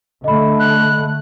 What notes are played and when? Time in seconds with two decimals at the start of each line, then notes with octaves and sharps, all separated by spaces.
0.24 D3 A3 D#5 B5
0.60 F#6